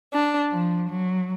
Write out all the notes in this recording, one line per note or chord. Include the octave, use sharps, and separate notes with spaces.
D4
F3
F#3